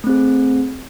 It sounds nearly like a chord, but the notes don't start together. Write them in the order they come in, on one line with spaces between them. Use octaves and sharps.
A3 C4 G#4